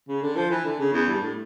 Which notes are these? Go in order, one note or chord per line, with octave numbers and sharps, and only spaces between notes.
C#3
D3
F3
E3
D3
C#3
E2
G2
A2